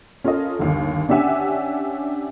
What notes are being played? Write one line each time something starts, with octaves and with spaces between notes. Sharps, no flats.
C#4 F4 A4 A#4 D#5
G1 D#2
C#4 D4 G4 E5 F#5 G#5